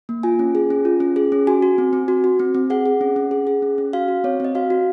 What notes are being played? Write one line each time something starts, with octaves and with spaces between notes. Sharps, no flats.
A#3
F4 G#5
C#4
G#4
C#4
F4
C#4
G#4
C#4
F#4 G#5
F#4
C4
C4
F#4
F#4
C4
C4
G#4 F#5
G#4
C#4
C#4
G#4
G#4
C#4
C#4
F#4 F5
F#4
C4 C#5
C4 D#5
F#4 F5
F#4